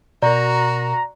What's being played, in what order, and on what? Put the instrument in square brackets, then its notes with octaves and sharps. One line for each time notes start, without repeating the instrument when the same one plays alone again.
[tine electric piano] B2 A#4 [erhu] F#4 [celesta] D5 [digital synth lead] A#5